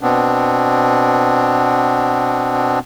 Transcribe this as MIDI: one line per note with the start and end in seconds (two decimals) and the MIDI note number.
0.01 2.79 47
0.01 2.79 59
0.01 2.79 60
0.01 2.79 62